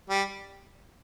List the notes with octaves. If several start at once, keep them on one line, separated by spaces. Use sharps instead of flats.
G3